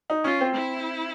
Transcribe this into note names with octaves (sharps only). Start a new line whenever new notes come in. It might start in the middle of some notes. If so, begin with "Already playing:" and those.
D#4
C#4 F4
C4
E4